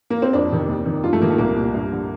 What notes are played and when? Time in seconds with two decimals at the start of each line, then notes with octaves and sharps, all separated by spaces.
0.10 A#3
0.22 C4
0.33 F2 D4
0.51 C3 D#3
0.68 D#2
0.85 D#3
1.04 G2 F4
1.13 A3
1.21 D#3 A#3
1.30 A3
1.38 C2 A#3
1.56 A#2
1.74 G2
1.92 D3